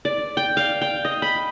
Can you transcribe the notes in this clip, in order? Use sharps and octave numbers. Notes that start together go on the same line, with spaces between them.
D5
G5
F5
G5
D#5
B5